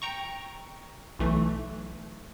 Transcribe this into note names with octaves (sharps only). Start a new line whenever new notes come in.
G5 A#5 C#6
B1 E3 A3